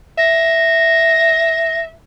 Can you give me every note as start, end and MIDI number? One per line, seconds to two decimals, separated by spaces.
0.18 1.91 76
0.18 1.81 94